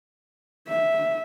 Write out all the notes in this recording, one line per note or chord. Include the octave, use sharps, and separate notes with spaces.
E5